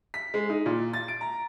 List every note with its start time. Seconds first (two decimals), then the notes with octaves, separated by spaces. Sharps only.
0.14 B6
0.34 G#3
0.50 D#4
0.66 A#2
0.93 A6
1.08 D7
1.21 A#5